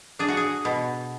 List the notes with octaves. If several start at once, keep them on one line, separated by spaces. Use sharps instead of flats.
D4 G#4
F#4
G#4
B2